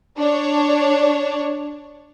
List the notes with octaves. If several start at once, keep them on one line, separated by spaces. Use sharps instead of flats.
D4 C#5